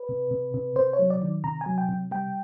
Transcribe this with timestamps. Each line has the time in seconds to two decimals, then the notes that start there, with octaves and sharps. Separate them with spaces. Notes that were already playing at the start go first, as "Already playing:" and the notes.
Already playing: B4
0.09 C3
0.31 C3
0.54 C3
0.76 C3 C5
0.93 C#5
0.99 F#3
1.10 D5
1.22 D#3
1.44 C3 A#5
1.61 G#5
1.66 F#3
1.78 G5
1.89 C3
2.11 G3 G5